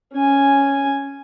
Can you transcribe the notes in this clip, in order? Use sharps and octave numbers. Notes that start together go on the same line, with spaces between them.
C#4 G#5